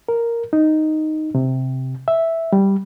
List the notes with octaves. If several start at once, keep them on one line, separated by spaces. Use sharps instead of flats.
A#4
D#4
C3
E5
G3